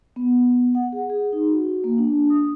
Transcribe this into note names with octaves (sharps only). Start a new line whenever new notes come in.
B3
B3
F#5
G#4
G#4
D#4
F#4
A#3
D4
D#6